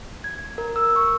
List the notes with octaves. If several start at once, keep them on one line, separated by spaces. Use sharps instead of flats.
G#6
A#4
E6
C#6